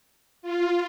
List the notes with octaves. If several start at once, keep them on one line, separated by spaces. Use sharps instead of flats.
F4